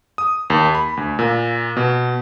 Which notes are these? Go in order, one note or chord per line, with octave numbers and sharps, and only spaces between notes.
D#6
D#2
B5
D2
A#2
B2